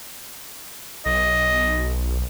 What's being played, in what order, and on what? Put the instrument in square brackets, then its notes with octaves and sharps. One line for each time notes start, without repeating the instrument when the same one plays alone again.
[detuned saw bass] B1 [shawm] D#5